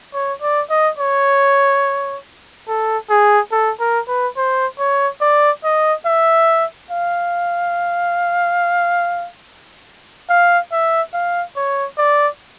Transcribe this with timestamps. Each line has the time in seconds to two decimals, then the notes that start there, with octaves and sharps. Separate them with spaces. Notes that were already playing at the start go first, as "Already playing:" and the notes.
0.14 C#5
0.41 D5
0.70 D#5
0.99 C#5
2.68 A4
3.10 G#4
3.52 A4
3.80 A#4
4.08 B4
4.37 C5
4.79 C#5
5.21 D5
5.64 D#5
6.06 E5
6.91 F5
10.29 F5
10.72 E5
11.13 F5
11.56 C#5
11.98 D5